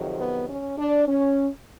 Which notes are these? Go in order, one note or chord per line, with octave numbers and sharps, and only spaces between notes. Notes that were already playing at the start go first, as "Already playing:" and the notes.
Already playing: F2 C3 D#3 F#3
B3
C#4
D4
C#4